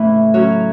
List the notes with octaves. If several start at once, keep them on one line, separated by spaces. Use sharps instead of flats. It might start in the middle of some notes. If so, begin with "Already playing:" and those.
Already playing: A2 C#3 E3 A3 E4 B4
F#3 C#4 F#4 C#5